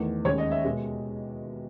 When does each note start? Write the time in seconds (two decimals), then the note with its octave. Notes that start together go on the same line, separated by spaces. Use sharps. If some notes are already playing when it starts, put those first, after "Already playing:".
Already playing: E2 D#3 A3
0.25 D#2 C#3 G#3 C#5
0.38 D#5
0.51 E5
0.65 B2 G#3